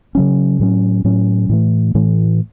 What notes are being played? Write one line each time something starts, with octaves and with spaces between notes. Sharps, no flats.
C#3 F#3 C#4
A2 F#3 C#4
A2 F#3 C#4
A2 E3 A3
A2 E3 A3